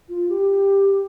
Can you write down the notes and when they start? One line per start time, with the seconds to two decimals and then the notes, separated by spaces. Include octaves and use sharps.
0.09 F4
0.29 G4